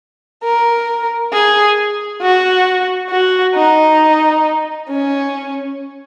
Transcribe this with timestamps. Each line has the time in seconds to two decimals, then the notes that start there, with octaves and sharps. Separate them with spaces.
0.44 A#4
1.33 G#4
2.22 F#4
3.11 F#4
3.55 D#4
4.89 C#4